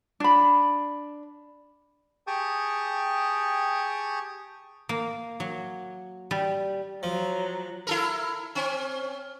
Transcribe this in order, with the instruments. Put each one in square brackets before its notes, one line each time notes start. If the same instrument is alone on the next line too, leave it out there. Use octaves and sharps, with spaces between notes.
[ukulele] D4 B5
[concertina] G4 G#4 G5 A5 C#6 D#6
[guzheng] A#3
F#3
G3
[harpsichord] F3 [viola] F#3
[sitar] E4 A4 A#4
C4 C#4